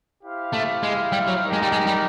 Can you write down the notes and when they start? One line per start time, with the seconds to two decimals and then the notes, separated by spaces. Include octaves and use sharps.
0.23 E4 G4 C5 F5
0.53 A3
0.83 G#3
1.12 G3
1.28 F#3
1.43 D#4 G4 A#4
1.53 G#3
1.62 G3
1.72 G#3
1.87 G3